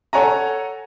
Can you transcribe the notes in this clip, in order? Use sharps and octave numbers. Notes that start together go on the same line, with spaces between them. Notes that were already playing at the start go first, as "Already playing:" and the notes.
A4 C#5 F#5 G#5 A#5